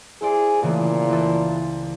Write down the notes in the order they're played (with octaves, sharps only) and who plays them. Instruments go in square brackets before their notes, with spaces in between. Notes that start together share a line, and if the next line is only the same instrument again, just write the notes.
[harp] E4 C5 D5 [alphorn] G#4
[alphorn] A#2 [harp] C#3 E3 A3
[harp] C#2 E3 A4